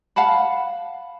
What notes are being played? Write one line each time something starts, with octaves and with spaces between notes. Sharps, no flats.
F5 F#5 A5 B5